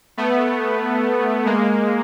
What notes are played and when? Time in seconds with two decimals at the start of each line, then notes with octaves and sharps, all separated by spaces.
0.17 A3 B3
1.46 G#3 A#3